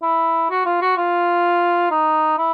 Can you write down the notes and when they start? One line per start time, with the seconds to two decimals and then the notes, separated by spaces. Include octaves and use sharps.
0.03 E4
0.50 F#4
0.65 F4
0.81 F#4
0.97 F4
1.91 D#4
2.38 E4